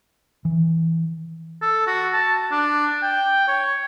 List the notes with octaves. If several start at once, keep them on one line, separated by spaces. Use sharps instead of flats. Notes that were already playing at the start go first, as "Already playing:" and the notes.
E3
A4
F#4
A5
D4
G5
C#5